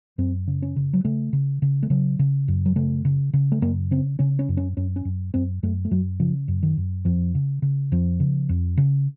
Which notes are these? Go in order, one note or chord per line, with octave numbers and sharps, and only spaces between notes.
F#2 C4
C#3
C#4
C#3
F#3
C#3 A3
C#3
C#3
A3
C#3 F#3
C#3
F#2
F#3
C#3 A3
C#3
C#3
A3
F#2 A#3
C#3 C4
C#3 C#4
C#4
F#2
C#4
F#2 C#4
C#4
F#2
F#2 C4
F#2 A3
A3
F#2 F#3
C#3 F3
F#2
D#3
F#2
F2 F3
C#3
C#3
F2 F3
C#3
F2
C#3